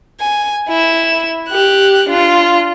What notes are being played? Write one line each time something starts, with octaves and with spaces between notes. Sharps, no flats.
G#5
E4 E7
G4 F#6
D4 F4